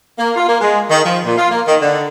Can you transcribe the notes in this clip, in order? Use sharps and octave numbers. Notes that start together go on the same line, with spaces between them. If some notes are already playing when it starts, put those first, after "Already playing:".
A#3
F4
A#3
G#3
D#3
F3
A#2
F4
A#3
D#3
D3